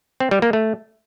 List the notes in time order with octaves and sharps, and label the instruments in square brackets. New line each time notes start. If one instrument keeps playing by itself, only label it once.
[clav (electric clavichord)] C4
G3
A#3
A3